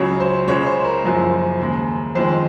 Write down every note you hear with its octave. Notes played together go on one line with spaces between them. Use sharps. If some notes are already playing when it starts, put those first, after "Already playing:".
Already playing: C#2 C#3 F#3 C#5
C5
C#2 C#3 G#3 C#5
C5
A#4
F#1 F#2 F3 G#3
D#2 C#3 G#3
F2 D#3 G#3 C5